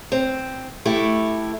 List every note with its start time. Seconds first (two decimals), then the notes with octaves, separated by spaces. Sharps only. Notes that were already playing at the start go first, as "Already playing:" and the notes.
0.12 C4
0.85 A3 E4 G4